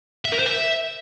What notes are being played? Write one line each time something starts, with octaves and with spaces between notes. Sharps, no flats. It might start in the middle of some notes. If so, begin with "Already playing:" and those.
E5
A#4
C5
E5